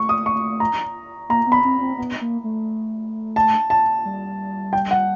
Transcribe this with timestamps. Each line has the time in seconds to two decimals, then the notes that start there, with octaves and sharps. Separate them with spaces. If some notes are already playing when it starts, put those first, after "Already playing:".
Already playing: A3 C#6
0.09 D#6
0.26 C#6
0.60 A#5
1.29 A#3 A#5
1.47 B3
1.52 B5
1.64 C4
1.81 C4
1.98 B3
2.21 A#3
2.44 A3
3.36 A5
3.70 A5
4.05 G3
4.73 G5
4.91 F#5